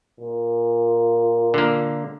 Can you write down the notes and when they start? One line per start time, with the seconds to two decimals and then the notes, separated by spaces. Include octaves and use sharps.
0.20 A#2
1.54 D3 A#3